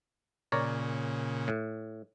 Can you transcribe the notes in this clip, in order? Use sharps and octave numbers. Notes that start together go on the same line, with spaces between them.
A#2 C#3 A#4 C#5 D5
A2